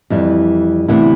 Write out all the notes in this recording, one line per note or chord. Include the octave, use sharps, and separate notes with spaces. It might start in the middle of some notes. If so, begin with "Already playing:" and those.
F2 E3 G3
D2 C3 E3 B3 E4